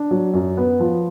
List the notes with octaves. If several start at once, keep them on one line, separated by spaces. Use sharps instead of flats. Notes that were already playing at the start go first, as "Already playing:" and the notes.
Already playing: D4
F#3
F#2
B3
F3